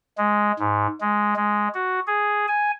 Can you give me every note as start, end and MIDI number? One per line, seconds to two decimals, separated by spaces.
0.18 0.52 56
0.59 0.87 44
1.01 1.35 56
1.36 1.68 56
1.74 2.00 66
2.07 2.46 68
2.48 2.71 80